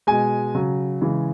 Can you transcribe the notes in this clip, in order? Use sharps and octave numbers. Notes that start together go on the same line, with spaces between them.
B2 G#3 G#5
C#3 F#3
C#3 E3 G#3